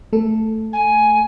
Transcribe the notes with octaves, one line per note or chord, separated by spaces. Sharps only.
A3 A4
G#5